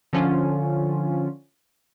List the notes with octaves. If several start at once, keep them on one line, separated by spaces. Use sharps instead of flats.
D3 F3 C#4 F4